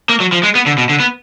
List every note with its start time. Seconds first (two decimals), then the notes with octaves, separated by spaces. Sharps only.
0.09 A#3
0.20 F#3
0.32 F3
0.43 G#3
0.55 B3
0.66 D3
0.78 B2
0.89 D3
1.00 B3